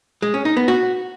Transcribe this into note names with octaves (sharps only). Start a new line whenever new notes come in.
G#3
C#4
D#4
B3
F#4